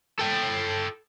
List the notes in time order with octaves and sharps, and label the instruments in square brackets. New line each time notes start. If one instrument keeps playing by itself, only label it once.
[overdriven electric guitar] A4 G5